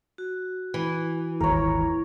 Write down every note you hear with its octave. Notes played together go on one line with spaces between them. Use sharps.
F#4
E3
D#1 G#1 A#4 C#5